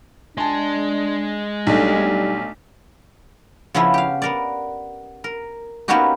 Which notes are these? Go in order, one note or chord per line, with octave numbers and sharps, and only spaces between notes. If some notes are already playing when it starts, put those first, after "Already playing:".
G#3 D4 G#5 A5 C6
B1 G3 A3 D4 D#4
C#3 F3 B3 C#4 E4
G4 F5
B3 A#4 D5
A#4
A#3 B3 C#4 D#4 F#4 G4